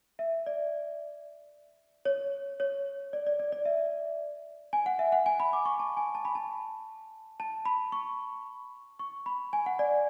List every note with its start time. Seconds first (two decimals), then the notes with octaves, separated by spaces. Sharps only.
0.19 E5
0.46 D5
2.05 C#5
2.60 C#5
3.13 D5
3.27 D5
3.39 D5
3.52 D5
3.65 E5
4.73 G#5
4.86 F#5
4.99 E5
5.12 F#5
5.26 G#5
5.40 B5
5.53 D6
5.65 C#6
5.80 A5
5.97 G#5
6.15 A5
6.25 B5
6.35 A5
7.40 A5
7.65 B5
7.92 C#6
8.99 C#6
9.26 B5
9.53 G#5
9.66 F#5
9.79 D5